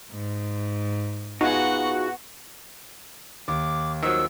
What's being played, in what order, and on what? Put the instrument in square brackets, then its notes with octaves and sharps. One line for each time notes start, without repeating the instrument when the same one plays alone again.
[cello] G#2
[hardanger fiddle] B3 F#5 [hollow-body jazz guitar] D#4 F4 G#4 [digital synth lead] F#4
[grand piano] D#2 [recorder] D6
[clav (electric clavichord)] D#3 F3 F#3 [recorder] E6